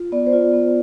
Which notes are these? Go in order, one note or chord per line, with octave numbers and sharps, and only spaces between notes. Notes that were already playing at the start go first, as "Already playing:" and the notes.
Already playing: F4
B3 D5
C5
F4 D5
B3